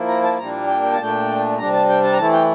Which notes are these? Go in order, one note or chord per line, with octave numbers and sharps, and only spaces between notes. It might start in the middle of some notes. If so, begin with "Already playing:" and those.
Already playing: F3 A#3 E4
A#5
A5
A#2 G3 A#3 D4 A#5
G5
G5
A5
A#2 A3 D4 G5
C3 G3 D4 A#5
A5
G5
A5
A#5
E3 A3 E4 A5
G5